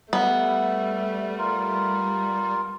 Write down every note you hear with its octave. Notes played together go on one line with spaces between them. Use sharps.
G3 A3 B3
F4 A#4